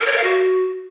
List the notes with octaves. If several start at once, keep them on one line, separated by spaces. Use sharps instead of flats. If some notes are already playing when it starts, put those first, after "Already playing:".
A#4
C#5
A#4
F5
F#4